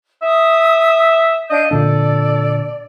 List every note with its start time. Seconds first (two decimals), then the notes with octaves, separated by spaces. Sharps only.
0.22 E5 D#6
1.50 D4 D#5 F5 G6
1.71 A#2 D3 D4 A4 D5